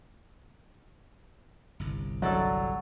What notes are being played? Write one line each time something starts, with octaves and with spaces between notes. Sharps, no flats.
G1 C2
F#3 A4 D5 D#5 F#5 C#6 E6